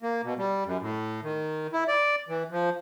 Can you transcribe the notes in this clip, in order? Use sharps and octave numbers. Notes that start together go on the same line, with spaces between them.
A#3
B2
G3
F#2
A2
D#3
E4
D5
E3
F3